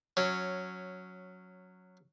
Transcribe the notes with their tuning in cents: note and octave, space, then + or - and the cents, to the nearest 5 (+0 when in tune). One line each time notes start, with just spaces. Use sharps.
F#3 -10 C#4 +0